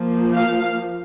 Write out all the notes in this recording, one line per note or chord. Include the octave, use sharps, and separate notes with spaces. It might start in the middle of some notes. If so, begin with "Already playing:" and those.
Already playing: F3 A#3
F5